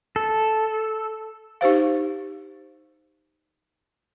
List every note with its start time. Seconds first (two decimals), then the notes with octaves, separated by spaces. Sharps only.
0.16 A4
1.61 D#4 G4 C5 F5